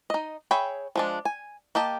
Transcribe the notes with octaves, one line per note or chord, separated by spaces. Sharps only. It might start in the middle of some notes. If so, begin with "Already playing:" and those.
D#4 D#5
G#4 C#5 E5 G5 B5
F3 G#3 D4
G#5
A#3 G4 D#5 A5